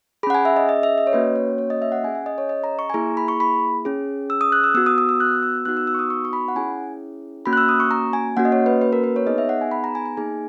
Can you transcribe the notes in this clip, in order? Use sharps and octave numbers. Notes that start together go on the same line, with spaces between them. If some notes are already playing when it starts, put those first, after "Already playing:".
C#4 G#4 F#5 B5
G#5
E5
D#5
D#5
E5
D#5
C#5
A#3 C#4 F#4 B4
C#5
C#5
D#5
E5
F#5
C#4 G#4 G#5
G#5
D#5
C#5
D#5
A#5
C#6
G#5
A#3 E4 G#4 A#5
B5
C#6
B5
C#4 G#4
E6
D#6
F#6
E6
B3 F#4 E6
D#6
D#6
E6
F#6
E6
B3 D#4 F#4 F#6
E6
E6
C#6
D#6
C#6
C#6
B5
F#5
C#4 E4 G#4 G#5
A#3 C#4 F#4 B5
F#6
E6
D#6
C#6
A#5
G#5
A#3 C#4 F#4 F#5
D#5
C#5
B4
B4
A#4
B4
C#5
B3 D#4 G#4 D#5
E5
F#5
G#5
B5
A#5
G#5
G#5
A#3 D#4 G#4 G#5